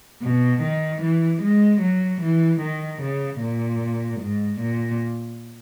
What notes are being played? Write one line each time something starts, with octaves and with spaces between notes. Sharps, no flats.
B2
D#3
E3
G#3
F#3
E3
D#3
C#3
A#2
G#2
A#2